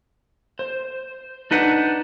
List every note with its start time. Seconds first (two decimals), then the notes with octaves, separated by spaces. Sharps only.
0.59 C5
1.51 D4 D#4 B4 F#5